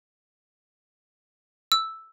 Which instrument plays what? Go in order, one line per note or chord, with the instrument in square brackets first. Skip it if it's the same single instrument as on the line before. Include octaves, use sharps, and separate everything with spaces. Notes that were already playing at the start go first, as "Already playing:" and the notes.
[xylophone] E6